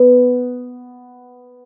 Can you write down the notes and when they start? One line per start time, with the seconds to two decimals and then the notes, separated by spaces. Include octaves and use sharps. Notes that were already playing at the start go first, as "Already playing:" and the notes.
Already playing: B3